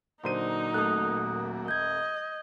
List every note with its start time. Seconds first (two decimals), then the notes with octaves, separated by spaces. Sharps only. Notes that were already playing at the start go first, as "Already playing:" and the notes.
0.24 A#2 D3 F#3 D#4 C5 D#7
0.74 D#1 A3 D#6 F#6
1.68 D#5 G6 G#6